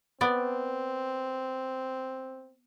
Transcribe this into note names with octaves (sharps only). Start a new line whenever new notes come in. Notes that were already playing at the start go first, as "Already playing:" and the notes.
B3 C4 D5